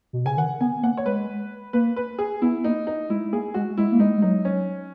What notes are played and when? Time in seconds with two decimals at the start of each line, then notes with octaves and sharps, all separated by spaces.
0.13 B2
0.25 C#3 G#5
0.37 D#3 F#5
0.61 B3 G#5
0.83 A#3 F#5
0.97 C#5
1.06 G#3 B4
1.73 A#3 B4
1.96 B4
2.18 G#4
2.42 B3 E4
2.64 A#3 D#4
2.87 D#4
3.10 G#3 E4
3.32 A#3 G#4
3.54 G#3 F#4
3.77 G#3 E4
3.92 A#3
4.00 G#3 D#4
4.18 G#3
4.22 F#3 D#4
4.45 C#4